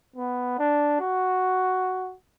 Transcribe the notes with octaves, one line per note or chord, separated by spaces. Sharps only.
B3
D4
F#4